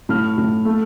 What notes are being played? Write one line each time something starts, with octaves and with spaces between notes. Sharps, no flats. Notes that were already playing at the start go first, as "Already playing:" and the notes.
A2 F6
A2
A3